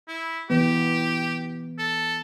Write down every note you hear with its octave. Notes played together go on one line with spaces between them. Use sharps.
E4
E3 B3 G4
A4